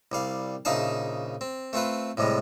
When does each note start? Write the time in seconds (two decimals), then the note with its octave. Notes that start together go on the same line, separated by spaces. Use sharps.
0.12 C2 G3 F5
0.65 A#1 C#3 D#4 E5 F5 A5
1.41 C4
1.73 A3 C4 F4 B4
2.17 A2 C3 G3 G#3